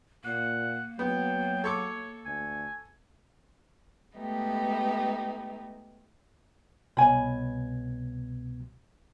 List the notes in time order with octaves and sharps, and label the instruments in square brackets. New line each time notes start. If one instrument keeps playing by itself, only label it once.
[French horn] A#2 [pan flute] A#3 [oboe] F#5
[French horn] F#3 [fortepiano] B3 [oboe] G5
[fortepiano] A4 C#6 D6 [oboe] C#5
[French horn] D2 [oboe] G#5
[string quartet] G#3 A3 B3 D#4 G4
[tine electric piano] C2 B2 G#6 [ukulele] C#5 G#5 B5